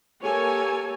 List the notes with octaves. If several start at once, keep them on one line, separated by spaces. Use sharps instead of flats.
A#3 G4 A4 A#4 C#5 G#5